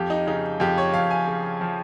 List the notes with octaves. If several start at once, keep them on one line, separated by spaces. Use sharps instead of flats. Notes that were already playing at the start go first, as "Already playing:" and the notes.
Already playing: F2 G4
D#4
C#3 D#4
F2 G4
C#5
F2 F5
G#5
C#3
F3